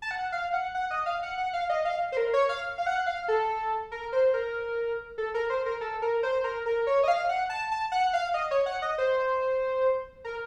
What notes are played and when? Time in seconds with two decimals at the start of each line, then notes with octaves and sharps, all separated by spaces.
0.02 A5
0.11 F#5
0.32 F5
0.53 F#5
0.75 F#5
0.91 D#5
1.06 F5
1.23 F#5
1.38 F#5
1.53 F5
1.69 D#5
1.85 F5
2.12 C5
2.17 A#4
2.33 C#5
2.49 F5
2.78 F5
2.86 F#5
3.06 F5
3.28 A4
3.92 A#4
4.12 C5
4.34 A#4
5.18 A4
5.34 A#4
5.50 C5
5.66 A#4
5.81 A4
6.02 A#4
6.23 C5
6.44 A#4
6.66 A#4
6.87 C#5
7.03 D#5
7.08 F5
7.29 F#5
7.49 A5
7.71 A5
7.92 F#5
8.13 F5
8.34 D#5
8.51 C#5
8.66 F#5
8.82 D#5
8.98 C5
10.24 A#4